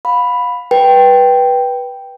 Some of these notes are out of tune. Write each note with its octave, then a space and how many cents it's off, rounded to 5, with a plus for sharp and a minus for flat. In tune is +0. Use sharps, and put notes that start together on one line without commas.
F5 +30 B5 +0
B4 -15 G5 +0